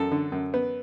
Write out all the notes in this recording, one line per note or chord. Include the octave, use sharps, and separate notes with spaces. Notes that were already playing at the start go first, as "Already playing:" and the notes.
Already playing: F#2 A4
D3
F#2
B3